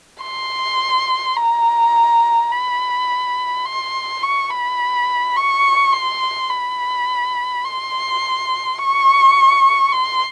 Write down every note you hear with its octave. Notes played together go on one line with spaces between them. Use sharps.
C6
A#5
B5
C6
C#6
B5
C#6
C6
B5
C6
C#6
C6